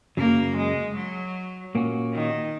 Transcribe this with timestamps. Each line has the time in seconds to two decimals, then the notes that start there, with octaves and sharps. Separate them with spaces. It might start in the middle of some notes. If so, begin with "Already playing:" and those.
0.17 F#2 C#3 F#3 A#3
0.57 G#3
0.96 F#3
1.75 A#2 A#3 C#4 F#4
2.14 D#3